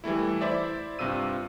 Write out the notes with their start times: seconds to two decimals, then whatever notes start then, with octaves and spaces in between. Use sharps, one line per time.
0.04 E3 G3 A3 E4
0.41 E4 C5 D5 E5
0.99 G2 C3 F4 E6 D#7